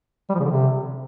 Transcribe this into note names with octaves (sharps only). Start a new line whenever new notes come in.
G3
F3
C#3
D3
C3